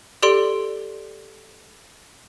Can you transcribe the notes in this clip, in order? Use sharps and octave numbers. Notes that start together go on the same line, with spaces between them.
G4 A4 D5 C6 D7